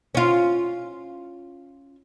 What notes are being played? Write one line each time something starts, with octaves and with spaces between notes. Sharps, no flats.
C#4 F4